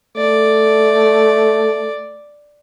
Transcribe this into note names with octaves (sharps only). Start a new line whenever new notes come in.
A3 D5